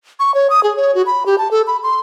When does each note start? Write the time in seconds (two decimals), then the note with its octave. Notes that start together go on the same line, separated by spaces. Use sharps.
0.19 C#6
0.34 C#5
0.50 D#6
0.63 G#4
0.77 C#5
0.95 F#4
1.06 B5
1.26 G4
1.38 A5
1.51 A4
1.67 B5
1.83 C6